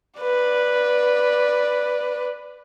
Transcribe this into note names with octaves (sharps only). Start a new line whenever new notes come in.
B4 D5